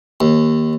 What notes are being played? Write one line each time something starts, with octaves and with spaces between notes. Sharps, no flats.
D#2